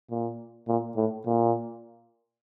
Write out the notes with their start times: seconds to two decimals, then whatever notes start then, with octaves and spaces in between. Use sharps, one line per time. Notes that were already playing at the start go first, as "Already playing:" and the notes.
0.10 A#2
0.68 A#2
0.96 A2
1.26 A#2